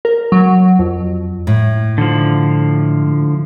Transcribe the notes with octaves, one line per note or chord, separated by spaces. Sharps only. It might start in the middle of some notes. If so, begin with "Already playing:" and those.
A#4
F#3
F2
A2
D3 F3